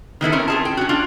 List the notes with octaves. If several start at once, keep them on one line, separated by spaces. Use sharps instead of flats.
D#3 B3 E4 A4
C4 C#4 A#4
F4 G#4 A5
G5
C#4 F#4
D4 F4